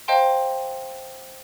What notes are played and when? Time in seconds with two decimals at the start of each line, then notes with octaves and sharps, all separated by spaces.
0.08 C5 D#5 F5 G5 A5 C6